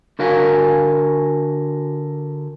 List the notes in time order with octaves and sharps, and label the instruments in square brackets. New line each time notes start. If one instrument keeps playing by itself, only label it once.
[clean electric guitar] D3 F#4 A#4 F5 G#5